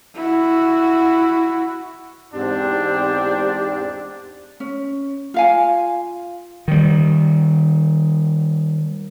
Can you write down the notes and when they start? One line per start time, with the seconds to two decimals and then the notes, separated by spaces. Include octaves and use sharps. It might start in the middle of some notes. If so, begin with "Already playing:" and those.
0.15 E4 F#4
2.33 E2 G#2 C4 D4 G4
4.60 C#4
5.34 F4 F5 G#5
6.68 D#3 G3